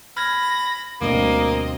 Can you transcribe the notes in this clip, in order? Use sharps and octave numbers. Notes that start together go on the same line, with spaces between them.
B5 F6 G#6 A#6
D2 G2 B2 A#3 C4 D#5